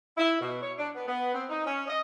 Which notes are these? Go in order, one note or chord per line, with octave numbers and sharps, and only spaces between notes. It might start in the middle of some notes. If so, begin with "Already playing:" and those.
E4
B2
C#5
D4
B3
B3
C4
D#4
C#4
D#5